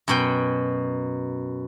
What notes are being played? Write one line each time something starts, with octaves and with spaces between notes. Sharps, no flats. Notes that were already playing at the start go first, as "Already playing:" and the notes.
F#2 B2 G5